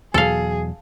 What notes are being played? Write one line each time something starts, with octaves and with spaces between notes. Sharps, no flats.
E2 B2 F#3 G#4 A4 F5